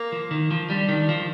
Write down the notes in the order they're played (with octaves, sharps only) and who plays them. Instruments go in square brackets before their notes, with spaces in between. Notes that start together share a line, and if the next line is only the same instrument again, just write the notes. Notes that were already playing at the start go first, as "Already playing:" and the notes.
Already playing: [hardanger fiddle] A#3
[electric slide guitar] F3
D#3
F3
[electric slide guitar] G3 [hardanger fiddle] D4
[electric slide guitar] D#3
F3